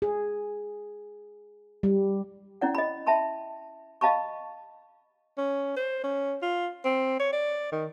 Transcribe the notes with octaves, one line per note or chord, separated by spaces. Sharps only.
G#4
G3
C#4 E4 D5 F#5
D#5 B5
E5 G5 A5 B5 C6
D#5 F5 A5 B5 C#6
C#4
C5
C#4
F4
C4
C#5
D5
D#3